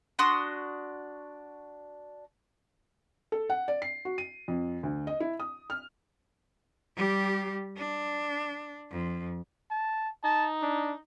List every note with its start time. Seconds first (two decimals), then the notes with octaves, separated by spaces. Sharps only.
0.19 D4 F#4 C6 D#6
3.32 A4
3.50 F#5
3.68 D5
3.82 C7
4.05 F#4
4.18 D#7
4.48 F2
4.83 D2
5.07 D#5
5.20 E4
5.40 D#6
5.70 F6
6.96 G3 G4
7.77 D4
8.90 F2
9.71 A5
10.24 D#4 A5
10.62 D4